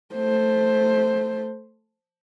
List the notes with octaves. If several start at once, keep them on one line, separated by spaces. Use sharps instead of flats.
A3 C5